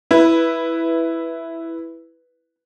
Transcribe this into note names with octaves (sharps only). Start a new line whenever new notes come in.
E4 B4